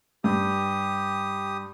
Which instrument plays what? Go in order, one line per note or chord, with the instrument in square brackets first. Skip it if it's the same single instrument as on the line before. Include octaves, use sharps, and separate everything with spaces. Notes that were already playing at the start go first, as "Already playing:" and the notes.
[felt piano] G2 [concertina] G4 D#6